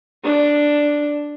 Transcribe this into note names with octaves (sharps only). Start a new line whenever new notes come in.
D4